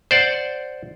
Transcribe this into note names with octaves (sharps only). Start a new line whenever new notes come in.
C5 D5 F#5